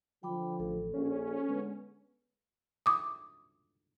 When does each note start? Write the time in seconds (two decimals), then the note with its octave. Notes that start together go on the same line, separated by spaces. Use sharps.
0.23 D3 F3 G5 B5 D6
0.59 A1 A4
0.94 A#1 C#4
1.48 D3 G#3 B3
2.86 D6 D#6